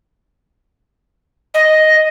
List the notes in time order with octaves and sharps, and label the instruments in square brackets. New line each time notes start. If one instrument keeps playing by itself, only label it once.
[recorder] D#5